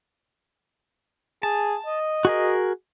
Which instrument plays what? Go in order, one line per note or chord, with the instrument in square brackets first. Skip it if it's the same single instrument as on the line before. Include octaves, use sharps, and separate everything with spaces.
[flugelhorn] G#4 [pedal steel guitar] A5
[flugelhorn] D#5
[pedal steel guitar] F#4 G#4 A#4